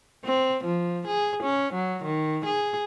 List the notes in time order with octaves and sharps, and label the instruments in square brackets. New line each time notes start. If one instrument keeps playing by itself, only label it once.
[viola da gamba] C4
F3
G#4
C#4
F#3
D#3
G#4